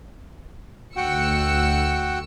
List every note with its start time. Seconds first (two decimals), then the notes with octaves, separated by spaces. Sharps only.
0.97 D2 F#4 F#5 G5 E6 C#7